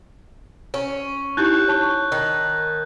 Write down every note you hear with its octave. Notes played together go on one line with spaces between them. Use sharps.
C#4
D#4 E4 G4 F#6 G6
C#5 A5 C#6
D#3